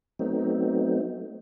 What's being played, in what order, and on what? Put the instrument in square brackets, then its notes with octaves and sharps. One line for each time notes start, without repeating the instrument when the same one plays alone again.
[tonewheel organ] F#3 A3 B3 C4 D#4